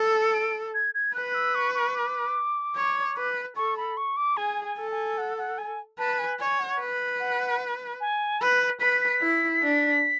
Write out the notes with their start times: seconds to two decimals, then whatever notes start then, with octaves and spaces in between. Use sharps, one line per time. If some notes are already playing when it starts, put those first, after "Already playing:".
Already playing: A4
0.22 C#7
0.33 D7
0.74 G#6
0.94 G#6
1.15 B4 F#6
1.34 E6
1.55 C#6
1.75 C#6
1.95 D6
2.76 C#5
3.17 B4
3.56 A4 C#6
3.77 B5
3.97 C#6
4.17 D6
4.37 G#4 G#5
4.64 G#5
4.78 A4
4.91 G#5
5.18 F#5
5.38 F#5
5.58 G#5
5.98 B4 A5
6.19 G#5
6.39 C#5 G#5
6.59 F#5
6.80 B4
7.20 F#5
8.00 G#5
8.41 B4 B5
8.81 B4 B6
9.01 B6
9.21 E4
9.62 D4